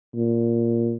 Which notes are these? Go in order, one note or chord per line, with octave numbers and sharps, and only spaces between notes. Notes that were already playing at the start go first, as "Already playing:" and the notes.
A#2